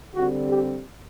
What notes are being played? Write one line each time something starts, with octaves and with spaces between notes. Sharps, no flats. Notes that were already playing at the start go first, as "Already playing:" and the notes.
D3 G3 C4 F#4
G4